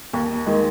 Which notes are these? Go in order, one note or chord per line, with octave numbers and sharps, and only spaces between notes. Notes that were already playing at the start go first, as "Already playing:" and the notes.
D#2
D#3 G#3